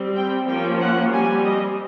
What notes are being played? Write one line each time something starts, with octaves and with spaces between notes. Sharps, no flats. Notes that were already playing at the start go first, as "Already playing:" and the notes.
Already playing: G3 C4
G5
F3 A#3 C#4 G5
F#5
G3 C4 G#5
D#5